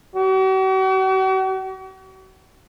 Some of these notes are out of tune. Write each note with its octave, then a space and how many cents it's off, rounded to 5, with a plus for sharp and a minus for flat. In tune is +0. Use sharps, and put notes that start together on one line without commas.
F#4 +45